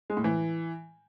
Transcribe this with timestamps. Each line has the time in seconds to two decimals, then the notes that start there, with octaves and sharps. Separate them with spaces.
0.10 G#3
0.17 A2
0.24 E3